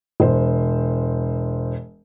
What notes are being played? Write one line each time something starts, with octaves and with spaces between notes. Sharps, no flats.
E1 C5